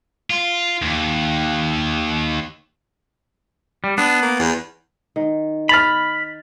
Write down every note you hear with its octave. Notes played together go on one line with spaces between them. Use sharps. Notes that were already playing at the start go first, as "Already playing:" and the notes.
F4
D#2
G3
B3 D4
A#3
E2
D#3
B5 F6 A6 F7